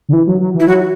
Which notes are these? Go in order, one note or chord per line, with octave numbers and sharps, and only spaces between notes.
D3
E3
F#3
F#3
E3
E4
F#3 F#4